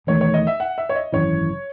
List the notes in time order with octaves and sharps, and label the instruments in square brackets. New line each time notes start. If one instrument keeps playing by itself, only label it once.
[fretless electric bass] E1 E2 D#3 A3 [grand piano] C#5
[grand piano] C#5
D#5
E5
F#5
E5
C#5
D#5
[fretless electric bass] G#1 F#2 C#3 E3 [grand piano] C#5